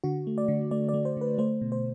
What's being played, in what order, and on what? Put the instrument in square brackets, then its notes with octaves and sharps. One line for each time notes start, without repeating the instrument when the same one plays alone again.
[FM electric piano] D3 F#4
A3
D5
D3
A3 D5
D5
A3
C5
D3 B4
A3 C5
B2
C5